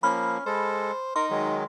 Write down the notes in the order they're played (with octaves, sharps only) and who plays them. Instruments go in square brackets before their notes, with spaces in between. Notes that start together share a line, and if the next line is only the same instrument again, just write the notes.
[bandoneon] F3 A#3 [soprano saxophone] C#4 [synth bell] B5 F6
[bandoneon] G#3 A4 [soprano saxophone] C5
[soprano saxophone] D#4 [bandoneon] A#4 [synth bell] C6
[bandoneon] D#3 F#3 G#3